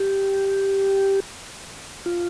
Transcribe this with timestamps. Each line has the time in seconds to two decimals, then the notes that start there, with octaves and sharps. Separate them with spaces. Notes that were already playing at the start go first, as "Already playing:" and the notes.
Already playing: G4
2.06 F4